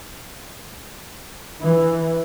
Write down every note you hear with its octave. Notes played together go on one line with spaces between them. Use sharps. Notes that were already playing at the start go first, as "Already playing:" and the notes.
E3